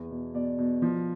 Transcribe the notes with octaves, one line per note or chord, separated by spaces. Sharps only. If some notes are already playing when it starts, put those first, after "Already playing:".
Already playing: E2
B2
B2 D5
B2
F3